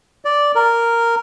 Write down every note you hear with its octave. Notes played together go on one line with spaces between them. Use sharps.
D5
A#4